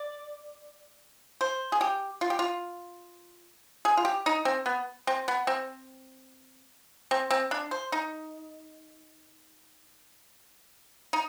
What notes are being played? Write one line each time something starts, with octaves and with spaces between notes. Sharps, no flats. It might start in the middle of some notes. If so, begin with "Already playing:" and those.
Already playing: D5
C5
G#4
G4
F4
G4
F4
G#4
F4
G4
D#4
C4
B3
C4
B3
C4
C4
C4
D4
C5
D#4
D#4